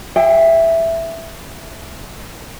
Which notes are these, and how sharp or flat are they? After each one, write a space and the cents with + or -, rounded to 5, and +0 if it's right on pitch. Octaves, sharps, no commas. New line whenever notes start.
G#4 -40 E5 +0 G5 +0